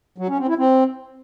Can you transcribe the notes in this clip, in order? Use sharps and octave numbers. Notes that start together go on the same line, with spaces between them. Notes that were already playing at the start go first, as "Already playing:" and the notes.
F#3
C#4
C4
E4
C4